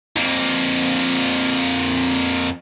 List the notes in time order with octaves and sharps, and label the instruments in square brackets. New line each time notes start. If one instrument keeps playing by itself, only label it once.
[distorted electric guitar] F2 A#3